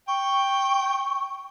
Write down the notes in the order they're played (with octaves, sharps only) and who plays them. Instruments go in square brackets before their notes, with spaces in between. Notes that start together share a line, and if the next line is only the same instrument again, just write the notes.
[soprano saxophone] G5 [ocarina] C#6